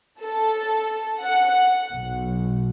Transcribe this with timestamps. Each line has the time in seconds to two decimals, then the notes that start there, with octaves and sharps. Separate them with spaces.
0.22 A4
1.21 F#5
1.92 B1